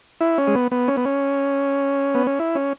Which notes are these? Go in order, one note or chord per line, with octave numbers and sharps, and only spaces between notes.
E4
C#4
G#3
B3
B3
C#4
B3
C#4
B3
C#4
E4
C#4